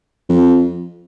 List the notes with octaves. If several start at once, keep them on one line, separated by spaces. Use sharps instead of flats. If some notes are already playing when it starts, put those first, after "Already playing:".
F2